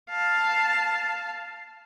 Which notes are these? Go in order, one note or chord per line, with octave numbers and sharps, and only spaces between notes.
F5 A5